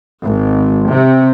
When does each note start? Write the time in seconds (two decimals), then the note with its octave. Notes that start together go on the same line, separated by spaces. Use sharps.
0.23 G#1
0.89 C3